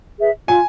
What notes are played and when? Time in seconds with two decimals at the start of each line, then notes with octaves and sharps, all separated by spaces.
0.19 G#4 B4 E5
0.48 F4 G#5